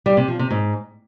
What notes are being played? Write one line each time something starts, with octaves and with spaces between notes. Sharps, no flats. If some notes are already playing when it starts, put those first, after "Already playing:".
G3
C3
F3
C3
G#2